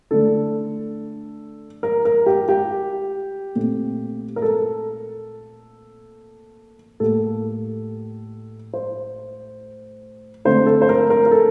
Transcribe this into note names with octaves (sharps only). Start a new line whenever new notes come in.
D3 A3 D4 A4
A#4
A#4
G4
G4
A#2 A3 C4
A#4
A4
A2 G3 A#3 A4
C5
D3 A3 C4 C5
A4
C5
A#4
A#4
A#4
A4